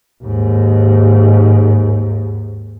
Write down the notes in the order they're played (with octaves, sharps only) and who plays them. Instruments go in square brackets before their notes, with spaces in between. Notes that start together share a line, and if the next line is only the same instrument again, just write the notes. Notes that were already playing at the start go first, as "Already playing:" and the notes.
[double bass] D#2 G#2